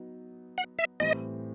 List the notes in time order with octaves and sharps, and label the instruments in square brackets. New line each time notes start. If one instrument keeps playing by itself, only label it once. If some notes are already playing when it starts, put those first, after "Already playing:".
Already playing: [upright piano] F#3 B3 D#4
[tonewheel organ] F#5
E5
[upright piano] A2 E3 G3 C4 [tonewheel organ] D#5